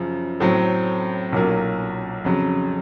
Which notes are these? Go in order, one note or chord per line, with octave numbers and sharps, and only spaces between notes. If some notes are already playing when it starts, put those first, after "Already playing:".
Already playing: F#2 C#3 F3
A2 F#3 A3 C4
B1 A#2 F#3 A#3
F2 C#3 F#3